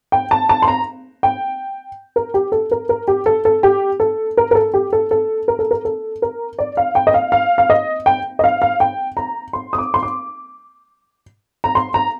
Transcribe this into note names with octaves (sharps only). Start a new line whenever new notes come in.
G5
A5
A5
C6
A#5
G5
A#4
G4
A4
A#4
A#4
G4
A4
A4
G4
A4
A#4
A#4
A4
G4
A4
A4
A#4
A4
A#4
A4
A#4
D5
F5
G5
D#5
F5
F5
F5
D#5
G5
D#5
F5
F5
G5
A#5
C6
D#6
D6
C6
D6
A#5
C6
A#5